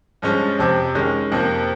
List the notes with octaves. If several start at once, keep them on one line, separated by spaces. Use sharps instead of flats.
G2 F3 G#3 C#4
F2 C3 F3
D#3 G#3 C#4
F2 C3 F3 A#3